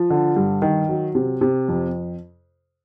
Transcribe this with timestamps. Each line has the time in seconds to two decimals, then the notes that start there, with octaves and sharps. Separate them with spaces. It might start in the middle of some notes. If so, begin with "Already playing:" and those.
Already playing: F3
0.10 D3
0.36 G2
0.62 D#3
0.89 F#3
1.15 C3
1.41 C3
1.68 F2